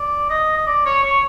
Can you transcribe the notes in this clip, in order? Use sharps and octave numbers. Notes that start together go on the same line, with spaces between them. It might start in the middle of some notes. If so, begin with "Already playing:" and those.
Already playing: D5
D#5
D#5
D5
C#5
C#5